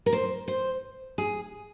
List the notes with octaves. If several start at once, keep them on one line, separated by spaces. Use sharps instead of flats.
A#4
C5
C5
G#4